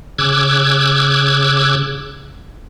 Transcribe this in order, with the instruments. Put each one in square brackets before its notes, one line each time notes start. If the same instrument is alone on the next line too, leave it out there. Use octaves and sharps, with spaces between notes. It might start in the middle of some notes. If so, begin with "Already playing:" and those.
[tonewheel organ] C#3 D6 E6 F#6 G#6